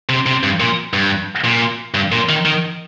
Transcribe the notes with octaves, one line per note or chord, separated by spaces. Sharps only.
C3
C3
G2
A#2
G2
A#2
G2
A#2
D#3
D#3